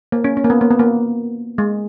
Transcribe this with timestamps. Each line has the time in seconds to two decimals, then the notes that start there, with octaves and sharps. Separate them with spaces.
0.12 A#3
0.24 C#4
0.37 C#4
0.44 A#3
0.50 B3
0.61 A#3
0.71 B3
0.79 A#3
1.58 G#3